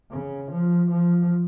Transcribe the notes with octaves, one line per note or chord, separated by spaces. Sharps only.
C#3
F3
F3